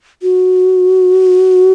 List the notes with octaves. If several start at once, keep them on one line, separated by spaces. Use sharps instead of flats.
F#4